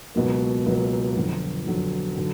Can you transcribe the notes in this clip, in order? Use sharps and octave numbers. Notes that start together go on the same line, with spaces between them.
C#2 B2 F#3 A#3
C#2 B2 F#3 A#3
F2 D3 F#3
F2 D3 F#3
D3 F#3